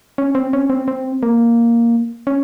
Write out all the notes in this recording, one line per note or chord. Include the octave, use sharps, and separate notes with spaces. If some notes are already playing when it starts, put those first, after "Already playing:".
C#4
C4
C#4
C4
C4
A#3
C#4